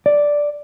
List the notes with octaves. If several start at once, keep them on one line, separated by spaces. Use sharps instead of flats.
D5